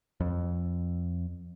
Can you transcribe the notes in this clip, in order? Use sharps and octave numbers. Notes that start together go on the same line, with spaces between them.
F2